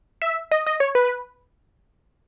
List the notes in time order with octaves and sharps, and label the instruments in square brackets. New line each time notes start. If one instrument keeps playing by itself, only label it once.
[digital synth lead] E5
D#5
D#5
C#5
B4